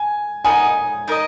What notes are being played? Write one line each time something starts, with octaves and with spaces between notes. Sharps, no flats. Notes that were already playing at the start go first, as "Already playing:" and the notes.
Already playing: G#5
B3 D#4 A#4 D#5 G#5
D#4 A#4 D#5